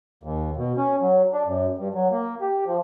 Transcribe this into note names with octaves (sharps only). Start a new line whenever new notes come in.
D#2
B2
C#4
F#3
D4
F#2
G2
F#3
A#3
G4
F3